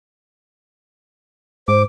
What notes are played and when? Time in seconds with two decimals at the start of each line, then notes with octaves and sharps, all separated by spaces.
1.68 G#2 C5 D6